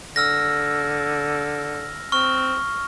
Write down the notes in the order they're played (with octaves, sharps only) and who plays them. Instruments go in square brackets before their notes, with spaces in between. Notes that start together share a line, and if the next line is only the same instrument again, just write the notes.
[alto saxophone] D3 [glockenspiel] E6 F6 A#6
[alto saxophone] C4 [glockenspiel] C#6 F6